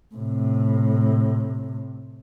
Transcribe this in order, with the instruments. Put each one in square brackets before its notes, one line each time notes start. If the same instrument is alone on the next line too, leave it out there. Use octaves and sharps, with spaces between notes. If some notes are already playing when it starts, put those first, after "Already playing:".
[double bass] A2 C3